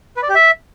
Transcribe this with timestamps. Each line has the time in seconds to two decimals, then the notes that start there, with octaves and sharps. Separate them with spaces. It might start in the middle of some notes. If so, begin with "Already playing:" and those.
0.17 B4
0.23 D5
0.29 G4
0.35 E5